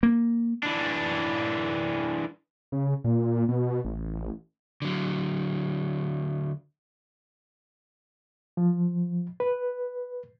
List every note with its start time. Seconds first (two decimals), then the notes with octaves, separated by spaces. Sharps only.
0.03 A#3
0.63 E3 D4
2.72 C#3
3.04 A#2
3.48 B2
3.85 A1
4.82 D3 F#3
8.57 F3
9.40 B4